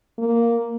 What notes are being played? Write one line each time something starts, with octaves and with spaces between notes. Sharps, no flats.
A#3